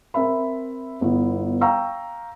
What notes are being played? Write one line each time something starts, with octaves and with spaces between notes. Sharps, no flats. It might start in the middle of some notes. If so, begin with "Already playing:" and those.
C4 A#4 E5 B5
G1 B3 E4
F5 G5 A#5 C#6 E6